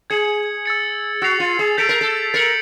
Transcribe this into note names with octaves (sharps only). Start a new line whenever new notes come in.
G#4 G#6 C#7 F#7
E6 A6 C#7
F#4 E6 A6 C7 F7
F4
G#4
A4 G6 B6 D7 F7
A#4
A4
A#4 A6 C#7 F#7